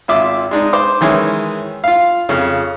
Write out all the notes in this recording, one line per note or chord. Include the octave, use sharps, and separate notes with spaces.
G#1 F4 E5 D6
G#3 D4 D#4
C5 D6
D#3 E3 G#3 C#4
F4 F5
F2 C#3